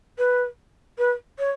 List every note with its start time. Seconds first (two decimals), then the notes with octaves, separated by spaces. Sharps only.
0.18 B4
0.98 B4
1.39 C#5